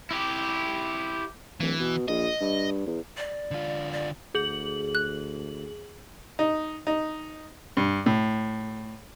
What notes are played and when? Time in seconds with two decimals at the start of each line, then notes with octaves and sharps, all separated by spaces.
0.11 E4 G4
1.60 D1 E3
1.80 B2
2.08 A#1 D#5
2.41 G2
2.87 E2
3.17 D5
3.51 D3 F4
3.93 D5
4.35 D2 G#4 F#7
4.95 F#6
6.39 D#4
6.87 D#4
7.77 G2
8.06 A2